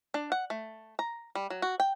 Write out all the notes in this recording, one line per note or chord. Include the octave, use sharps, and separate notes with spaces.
D4
F#5
A3
A#5
G3
F#3
F#4
G5